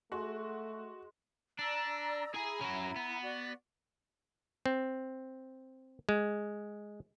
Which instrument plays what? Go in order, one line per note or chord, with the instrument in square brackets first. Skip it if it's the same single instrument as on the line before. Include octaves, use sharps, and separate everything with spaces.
[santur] G#3 [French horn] A3 [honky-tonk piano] F#4
[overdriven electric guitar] D4 [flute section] D5 A#5 E6
[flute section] E4 A#5 B5 [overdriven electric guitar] G#4 G#5
[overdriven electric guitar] C#4 F#4
B3
[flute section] F#4 D5
[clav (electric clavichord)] C4
G#3